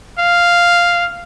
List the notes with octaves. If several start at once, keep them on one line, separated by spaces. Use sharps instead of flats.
F5